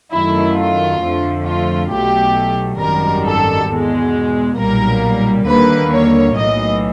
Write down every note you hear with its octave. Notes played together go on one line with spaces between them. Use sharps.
F#2 D#3 F#3 A3 E4
F4
F2 D3 F3 A3
F4
B1 B2 F#3 A3 G4
G#1 F#2 D#3 G3 A#4
A4
E2 B2 G#3
B1 A#2 G3 A#3 A#4
D#2 D3 G3 A#3 B4
C#5
B1 A2 E3 D#5